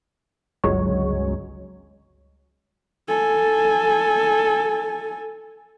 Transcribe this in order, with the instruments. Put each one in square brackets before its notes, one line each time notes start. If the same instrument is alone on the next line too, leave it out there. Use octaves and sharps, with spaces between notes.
[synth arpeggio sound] G1 C#2 F#3 G#3 C#5
[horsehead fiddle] A4 G#5